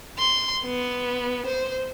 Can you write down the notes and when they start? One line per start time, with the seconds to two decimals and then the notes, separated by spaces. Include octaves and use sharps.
0.19 C6
0.65 B3
1.46 C5